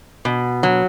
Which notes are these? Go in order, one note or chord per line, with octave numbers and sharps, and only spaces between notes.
B2
F#3